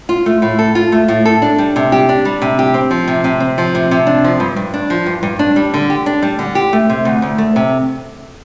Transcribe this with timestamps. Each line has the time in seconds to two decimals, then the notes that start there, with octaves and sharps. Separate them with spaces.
0.09 F4
0.26 A3
0.42 A2
0.59 A4
0.75 F4
0.92 A3
1.08 A2
1.25 A4
1.42 D4
1.58 G3
1.76 C3
1.92 G4
2.09 D4
2.25 G3
2.42 C3
2.59 G4
2.74 C4
2.91 F3
3.08 C3
3.24 C3
3.40 C4
3.58 F3
3.75 C3
3.91 C3
4.07 D4
4.24 F3
4.40 G2
4.56 G2
4.74 D4
4.90 F3
5.06 G2
5.23 G2
5.39 D4
5.56 G3
5.74 D3
5.90 G4
6.06 D4
6.22 G3
6.39 D3
6.55 G4
6.73 A3
6.90 C3
7.05 D2
7.22 D2
7.38 A3
7.56 C3